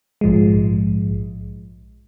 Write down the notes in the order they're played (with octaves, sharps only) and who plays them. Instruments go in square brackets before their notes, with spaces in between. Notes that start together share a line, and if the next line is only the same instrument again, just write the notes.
[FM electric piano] A#1 G#2 F3 G#3